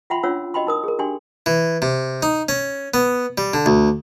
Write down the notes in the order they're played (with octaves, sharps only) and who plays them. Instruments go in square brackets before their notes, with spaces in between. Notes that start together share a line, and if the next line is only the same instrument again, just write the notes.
[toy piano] F4 E5 F#5 G5 B5 C6
C#4 D4 F4 C#5 F#5 E6
F#4 D#5 G5 B5 C6
D#4 A#4 D#6
G#4 A#4
D4 F#4 G4 G5 G#5 C6
[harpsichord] E3
C3
D#4
C#4
B3
G3
D3
D2